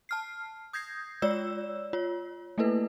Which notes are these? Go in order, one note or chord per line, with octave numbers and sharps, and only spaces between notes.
A5 F6 C7
D#6 G6 G#6 A#6 C7
G#3 F4 C#5 D5 E6 E7
F4 C#5
A3 A#3 E4 A4 B4